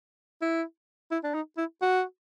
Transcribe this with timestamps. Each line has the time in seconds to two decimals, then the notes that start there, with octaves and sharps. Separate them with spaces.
0.41 E4
1.11 E4
1.24 D4
1.34 D#4
1.57 E4
1.82 F#4